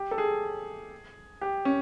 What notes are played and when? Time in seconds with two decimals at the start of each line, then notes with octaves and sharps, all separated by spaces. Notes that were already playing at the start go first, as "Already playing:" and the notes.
Already playing: G4
0.11 A4
0.18 G#4
1.41 G4
1.65 C#4